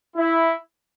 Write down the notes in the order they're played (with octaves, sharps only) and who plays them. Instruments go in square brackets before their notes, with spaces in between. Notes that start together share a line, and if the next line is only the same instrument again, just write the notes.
[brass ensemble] E4